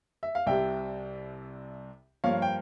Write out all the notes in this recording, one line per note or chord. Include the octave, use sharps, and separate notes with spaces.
E5
F5
C2 C3 G3 E5 G5
G2 F3 A#3 C#5 F5
G5